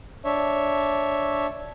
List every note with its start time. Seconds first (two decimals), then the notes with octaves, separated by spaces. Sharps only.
0.25 D4 C#5 E5